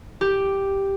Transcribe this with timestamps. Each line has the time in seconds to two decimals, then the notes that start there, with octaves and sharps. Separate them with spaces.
0.21 G4